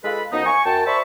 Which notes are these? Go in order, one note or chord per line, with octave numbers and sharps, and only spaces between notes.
G#3 F4 A4 B4 B5
F#2 F3 B3 D#4
G#5 C#6
F#2 G5 A5
C5 D5 E5 A5 B5 C#6